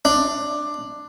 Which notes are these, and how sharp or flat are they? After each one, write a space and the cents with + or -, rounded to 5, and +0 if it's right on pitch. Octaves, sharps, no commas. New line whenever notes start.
D4 +10